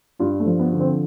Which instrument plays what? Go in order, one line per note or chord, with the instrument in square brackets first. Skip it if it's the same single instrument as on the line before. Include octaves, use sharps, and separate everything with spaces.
[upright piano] G2 F4
A3
F3
B3
D3
C4